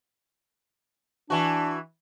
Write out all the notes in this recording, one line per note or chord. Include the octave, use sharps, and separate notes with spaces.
E3 D4 F#4